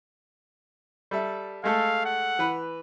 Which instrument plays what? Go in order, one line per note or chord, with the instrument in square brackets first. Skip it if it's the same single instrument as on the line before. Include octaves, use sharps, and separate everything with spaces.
[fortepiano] G3 A4 E5
[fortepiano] G#3 A3 A4 [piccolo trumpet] F5
[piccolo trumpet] F#5
[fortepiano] E3 B4